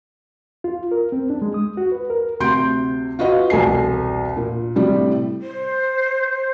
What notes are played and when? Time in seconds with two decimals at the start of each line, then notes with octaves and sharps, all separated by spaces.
0.64 F4
0.92 A#4
1.12 C4
1.30 D4
1.42 G#3
1.54 D#6
1.77 F#4
1.92 B4
2.10 A#4
2.40 D2 C3 C6 G6 D7
3.19 F4 F#4 B4 D#5 F5
3.50 E1 C2 A4 G#5 C7
4.37 A#2
4.76 A2 C3 G3
5.41 C5